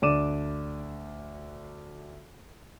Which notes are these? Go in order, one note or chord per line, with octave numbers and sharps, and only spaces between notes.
D2 D4 D5 D6 D#7 E7